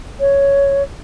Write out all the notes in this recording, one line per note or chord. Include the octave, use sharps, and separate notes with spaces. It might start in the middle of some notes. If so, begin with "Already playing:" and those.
C#5